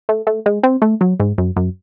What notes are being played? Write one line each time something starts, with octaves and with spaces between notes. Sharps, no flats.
A3
A3
G#3
C4
A3
F#3
G#2
F#2
F#2